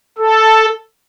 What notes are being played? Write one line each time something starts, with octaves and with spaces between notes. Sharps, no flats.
A4